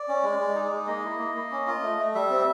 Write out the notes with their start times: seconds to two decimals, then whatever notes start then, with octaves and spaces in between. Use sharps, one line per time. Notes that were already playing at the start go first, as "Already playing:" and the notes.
Already playing: D5
0.08 C#4
0.23 G#3
0.39 G#3
0.55 D#4
0.72 G#3
0.87 A#3 D#5
1.04 E4
1.19 A#3
1.35 A#3
1.51 C#4
1.67 F4
1.83 A3
1.99 A3
2.15 G3 E5
2.30 C4